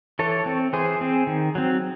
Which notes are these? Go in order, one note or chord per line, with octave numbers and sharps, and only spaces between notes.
E3 A4 C#5
C4
E3 G#4 C5
C4
D#3
F#3 C4